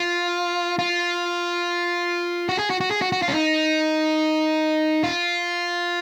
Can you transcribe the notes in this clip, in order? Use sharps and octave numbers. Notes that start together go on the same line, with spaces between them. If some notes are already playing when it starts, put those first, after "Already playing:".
Already playing: F4
F4
F#4
G#4
F#4
F#4
G#4
F#4
F#4
F4
C#4
D#4
F4